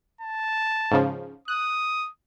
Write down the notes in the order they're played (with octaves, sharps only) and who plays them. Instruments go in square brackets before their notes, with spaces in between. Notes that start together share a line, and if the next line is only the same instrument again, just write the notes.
[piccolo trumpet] A5
[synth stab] G#2 C#3 F3
[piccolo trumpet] D#6 [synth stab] F#6